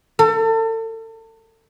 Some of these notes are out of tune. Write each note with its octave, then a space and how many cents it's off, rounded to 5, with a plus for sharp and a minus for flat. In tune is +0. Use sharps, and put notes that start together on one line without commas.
A4 +35